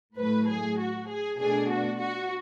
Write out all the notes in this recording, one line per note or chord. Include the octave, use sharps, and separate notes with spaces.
A2 F#3 A3 B4
G#4
F#4
G#4
B2 A3 D4 G#4
F#4
F#4